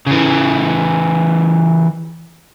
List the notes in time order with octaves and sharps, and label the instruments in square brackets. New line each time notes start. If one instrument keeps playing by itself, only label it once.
[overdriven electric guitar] C#3 E3